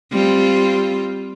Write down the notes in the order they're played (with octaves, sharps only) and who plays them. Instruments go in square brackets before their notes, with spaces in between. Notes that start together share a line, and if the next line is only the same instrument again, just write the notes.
[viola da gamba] G3 C4 F4